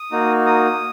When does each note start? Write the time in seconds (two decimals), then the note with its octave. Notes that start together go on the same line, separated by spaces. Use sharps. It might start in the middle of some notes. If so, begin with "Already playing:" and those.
Already playing: D#6
0.12 A#3 D#4 F#4
0.46 D#6